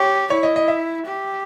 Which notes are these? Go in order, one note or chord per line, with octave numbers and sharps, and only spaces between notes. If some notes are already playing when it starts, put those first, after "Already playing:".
Already playing: G4 C#5
E4 C#5
D#5
D#5
E5
G4